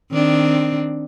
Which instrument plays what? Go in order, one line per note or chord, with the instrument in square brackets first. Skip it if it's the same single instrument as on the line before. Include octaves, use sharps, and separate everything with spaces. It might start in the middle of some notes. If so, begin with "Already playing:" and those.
[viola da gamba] D#3 C4 D4